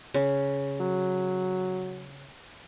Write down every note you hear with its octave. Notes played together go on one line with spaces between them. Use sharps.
C#3
F#3